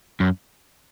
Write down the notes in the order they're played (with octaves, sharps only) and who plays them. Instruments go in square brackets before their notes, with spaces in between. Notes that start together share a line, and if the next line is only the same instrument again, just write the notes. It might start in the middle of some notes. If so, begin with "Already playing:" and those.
[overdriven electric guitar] F#2